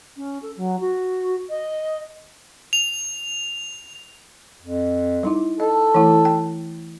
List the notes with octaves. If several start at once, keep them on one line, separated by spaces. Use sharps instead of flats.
C#4
A4
F#3
F#4
D#5
F7
F2
G3 D#4 E4
A4 D#5
E3 A3 E4
G5